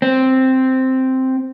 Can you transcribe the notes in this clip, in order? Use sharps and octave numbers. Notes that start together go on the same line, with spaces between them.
C4